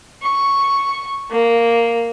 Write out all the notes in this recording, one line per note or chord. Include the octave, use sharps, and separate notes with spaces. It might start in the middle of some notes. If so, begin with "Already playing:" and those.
C#6
A#3